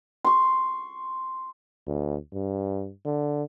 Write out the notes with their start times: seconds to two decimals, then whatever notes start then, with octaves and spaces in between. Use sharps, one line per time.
0.24 C6 C#6
1.87 D2
2.33 G2
3.05 D3